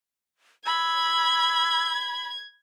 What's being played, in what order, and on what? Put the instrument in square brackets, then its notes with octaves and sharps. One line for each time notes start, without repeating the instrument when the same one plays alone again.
[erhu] B5 [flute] E6 [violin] G#6